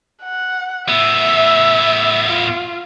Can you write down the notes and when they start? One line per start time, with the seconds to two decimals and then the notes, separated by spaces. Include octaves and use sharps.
0.23 F#5
0.89 A2 B3 E5
2.28 F4